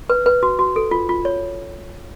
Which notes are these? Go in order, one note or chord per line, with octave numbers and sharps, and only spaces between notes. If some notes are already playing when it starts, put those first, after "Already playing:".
B4
B4
F#4
F#4
A4
F4
F4
C#5